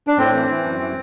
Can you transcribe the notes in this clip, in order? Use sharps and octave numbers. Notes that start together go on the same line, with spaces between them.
D4
A2 C4
E3
E3
F#2
E3